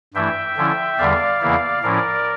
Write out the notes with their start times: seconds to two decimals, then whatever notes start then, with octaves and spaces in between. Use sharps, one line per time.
0.14 G2 E3 A3 E4 E5 G5
0.57 D3 F3 C#4 E4
0.98 E2 D3 G3 D5 F5
1.41 E2 C#3 E3 A#3 E4
1.83 A2 F3 C#4 E4 A#4 D5